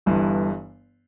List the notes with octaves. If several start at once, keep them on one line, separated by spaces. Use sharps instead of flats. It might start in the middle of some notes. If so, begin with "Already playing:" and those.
G1 G2 E3